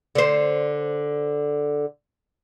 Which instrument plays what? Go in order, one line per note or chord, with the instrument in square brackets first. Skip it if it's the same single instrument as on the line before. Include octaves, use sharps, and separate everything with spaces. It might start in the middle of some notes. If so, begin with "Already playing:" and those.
[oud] D3 C5